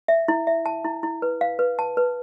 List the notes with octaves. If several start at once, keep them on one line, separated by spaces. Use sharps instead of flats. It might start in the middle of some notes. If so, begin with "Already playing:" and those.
E5
E4
E5
A5
E4
E4
B4
F5
B4
A5
B4